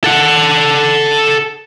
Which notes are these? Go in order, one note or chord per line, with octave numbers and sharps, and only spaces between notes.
A4 F#5